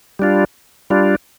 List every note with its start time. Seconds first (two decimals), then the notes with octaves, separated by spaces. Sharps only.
0.19 G3 D4 F4
0.90 G3 D4 F4